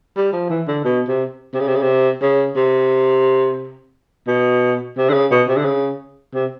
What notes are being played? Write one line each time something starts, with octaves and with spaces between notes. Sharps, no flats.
G3
F3
E3
D3
B2
C3
C3
C#3
C3
C#3
C3
C#3
C3
B2
C3
D3
C#3
B2
C3
D3
C#3
C3